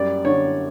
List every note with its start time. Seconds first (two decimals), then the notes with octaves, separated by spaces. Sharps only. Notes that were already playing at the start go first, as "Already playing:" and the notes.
Already playing: F#2 G3 D5
0.25 D3 C#5